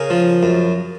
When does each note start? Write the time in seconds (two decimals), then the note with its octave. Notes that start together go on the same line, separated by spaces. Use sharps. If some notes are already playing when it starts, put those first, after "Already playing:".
Already playing: C#3 G#4 A#4
0.10 F3
0.43 F#2